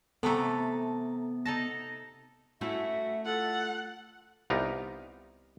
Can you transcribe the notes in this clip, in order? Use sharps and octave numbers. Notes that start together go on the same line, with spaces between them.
C3 E3 A3 B3 A4 A5 A#5
D#4 A4 A5 A#6
A3 C#4 E4 F#4 E5
F4 A4 F#5
C2 B3 D#4 F4 G4 A#5